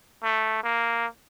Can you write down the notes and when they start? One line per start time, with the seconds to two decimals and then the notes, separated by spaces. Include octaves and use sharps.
0.23 A3
0.63 A#3